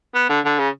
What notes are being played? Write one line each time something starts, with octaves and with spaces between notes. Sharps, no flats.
B3
D3
D3
C#3